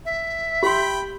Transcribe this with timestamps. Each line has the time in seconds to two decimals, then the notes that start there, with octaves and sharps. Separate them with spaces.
0.05 E5
0.63 G4 G5 B5 C6